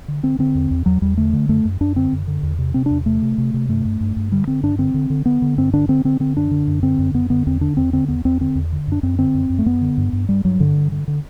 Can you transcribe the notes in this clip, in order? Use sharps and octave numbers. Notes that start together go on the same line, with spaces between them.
D3
D3 C4
D3 C4
E2
E2
E2 F#3
E2 G3
D3 A3
D3
F#2 A3
F#2
F#2 D4
D3 C4
F#2
D3
E2
C3
C3 C4
E2 D4
C3 A3
C3
C3
C3
G2 A3
G2
G2
G2
D3 G3
D3 C4
G2 D4
D3 C4
D3
D3
D3 B3
D3
G2 C4
D3 D4
D3 C4
D3 C4
D3 C4
F#2 D4
D3
F#2
D3 C4
F#2
F#2 B3
D3 B3
E2 C4
D3 D4
E2 C4
D3 C4
E2 B3
E2 C4
D3 C4
E2
D3
F#2 D4
F#2 C4
D3 C4
F#2
F#2
A3
F#2 B3
D3
G2
G2
G2 G3
G2 F#3
G2 D3
G2
D3
D3